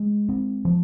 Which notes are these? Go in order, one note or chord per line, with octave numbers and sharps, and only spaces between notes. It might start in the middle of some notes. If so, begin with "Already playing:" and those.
Already playing: G#3
C4
F3